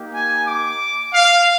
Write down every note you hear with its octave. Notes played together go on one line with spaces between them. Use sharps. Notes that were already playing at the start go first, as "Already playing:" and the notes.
Already playing: A#3 D#4 G4
G#5
D6
F5